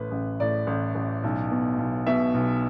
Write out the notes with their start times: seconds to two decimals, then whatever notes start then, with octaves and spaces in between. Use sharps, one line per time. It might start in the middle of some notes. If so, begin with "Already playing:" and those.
Already playing: A1 A2 B4
0.11 A1
0.40 A2 D5
0.67 A1
0.95 A1
1.24 B1
1.51 B2
1.79 B1
2.07 B2 E5
2.34 B1